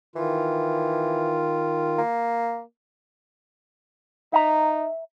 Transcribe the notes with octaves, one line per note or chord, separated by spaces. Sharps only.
D#3 E3 F4
A#3
D#4 E5 A#5